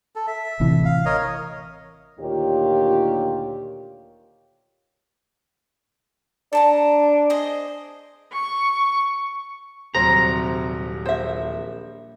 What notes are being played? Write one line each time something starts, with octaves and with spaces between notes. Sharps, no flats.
A4
E5
A1 C3 E3
F5
A#4 C#5 D#5
D2 A#2 D#3 F4 G4 C#5
D4 A4 A5 A#5
G#4 C5 D#5
C#6
D#1 C3 F#3 G3 C5 A#5
A#1 C5 E5